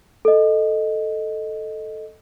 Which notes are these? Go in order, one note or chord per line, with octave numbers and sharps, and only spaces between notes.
A4 D#5